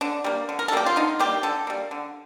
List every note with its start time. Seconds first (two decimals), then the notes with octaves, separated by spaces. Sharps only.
0.01 D3 D4
0.24 G3 A#3
0.49 D3
0.59 A#4
0.68 A4
0.72 G3 A#3 G4
0.86 F4
0.96 D3 D#4
1.19 G3 A#3 G4
1.43 D3 A4
1.67 G3 A#3
1.91 D3